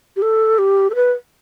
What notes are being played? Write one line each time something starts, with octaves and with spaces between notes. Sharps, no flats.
G4
A4
G4
A4
B4